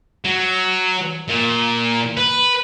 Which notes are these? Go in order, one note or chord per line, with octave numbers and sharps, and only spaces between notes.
F#3
A#2
B4